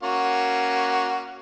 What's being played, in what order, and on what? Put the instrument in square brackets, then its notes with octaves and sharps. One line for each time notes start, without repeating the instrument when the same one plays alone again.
[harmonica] A#3 C#4 F#4